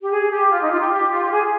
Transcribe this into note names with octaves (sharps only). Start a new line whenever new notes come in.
G4
G#4
G4
F4
D#4
F4
G4
G4
F4
G4
G#4